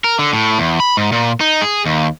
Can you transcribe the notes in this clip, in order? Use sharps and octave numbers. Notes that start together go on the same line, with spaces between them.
A#4
D3
A2
E2
B5
G#2
A#2
D#4
G#4
D#2